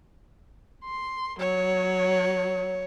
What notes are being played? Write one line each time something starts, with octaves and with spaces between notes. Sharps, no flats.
C6
F#3 C#5